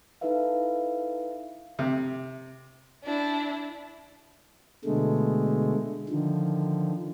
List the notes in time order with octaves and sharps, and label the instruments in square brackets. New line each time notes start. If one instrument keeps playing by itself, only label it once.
[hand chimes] D#4 E4 A4 B4 E5 F5
[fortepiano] C3
[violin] D4 E4
[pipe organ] B2 D3 G#3 A3
D3 D#3 F3